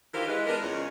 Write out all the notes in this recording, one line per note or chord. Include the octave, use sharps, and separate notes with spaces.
D#3 E3 F4 G4 A#4 C5
E3 G#3 B4
G#3 B3 D4 A#4
E2 C#3 G#3 C#4 F4 C#5